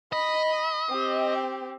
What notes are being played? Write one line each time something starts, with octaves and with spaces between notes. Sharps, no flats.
D#5 B5
C4 G4